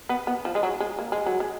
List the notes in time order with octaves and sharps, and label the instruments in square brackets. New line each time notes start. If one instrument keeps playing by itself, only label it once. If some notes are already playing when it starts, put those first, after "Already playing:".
[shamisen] B3
B3
F3
G#3
F#3
G#3
A#3
G#3
F#3
G#3